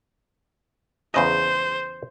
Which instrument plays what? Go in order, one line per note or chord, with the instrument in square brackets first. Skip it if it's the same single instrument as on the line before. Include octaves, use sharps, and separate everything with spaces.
[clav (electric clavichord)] E2 C#3 D#5 [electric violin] C5